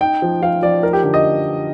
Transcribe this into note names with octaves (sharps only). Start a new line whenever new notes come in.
D#4 G5
F3
F3 F5
F3 D5
D#4 A#4
G4
D3 G4
D#5